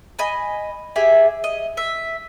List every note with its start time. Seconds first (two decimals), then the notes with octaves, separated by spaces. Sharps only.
0.19 D#5 G#5 B5
0.96 G4 G#4 E5
1.44 D#5
1.77 E5